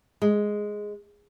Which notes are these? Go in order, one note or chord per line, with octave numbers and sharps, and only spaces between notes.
G#3